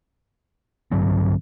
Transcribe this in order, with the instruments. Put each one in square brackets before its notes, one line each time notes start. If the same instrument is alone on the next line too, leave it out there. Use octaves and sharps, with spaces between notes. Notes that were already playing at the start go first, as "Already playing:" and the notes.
[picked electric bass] G2 D3 F#3 C4